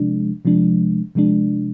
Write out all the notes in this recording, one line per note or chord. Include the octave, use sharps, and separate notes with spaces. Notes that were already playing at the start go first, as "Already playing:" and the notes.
Already playing: C3 F3 G#3 D4
C3 F3 G#3 D4
C3 F3 G#3 D4